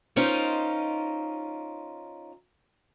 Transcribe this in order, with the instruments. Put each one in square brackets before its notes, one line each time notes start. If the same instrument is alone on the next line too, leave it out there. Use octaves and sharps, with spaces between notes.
[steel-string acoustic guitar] C#4 D#4 F4 A#4 C5 D#5